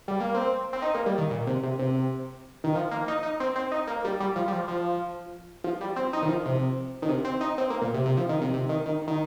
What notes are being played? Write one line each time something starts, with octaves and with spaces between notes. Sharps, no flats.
G3
A#3
C4
C4
D#4
A#3
G3
D#3
A#2
C3
C3
C3
D#3
F3
A#3
D#4
D#4
C4
C4
D#4
A#3
G3
G3
F3
G3
F3
F3
F3
G3
C4
D#4
D#3
F3
C3
D#3
C3
C4
D#4
C4
A#3
A#2
C3
C3
F3
D#3
C3
C3
D#3
D#3
D#3